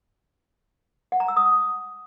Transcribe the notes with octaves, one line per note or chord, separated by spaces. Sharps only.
F#5
A#5
E6
D#6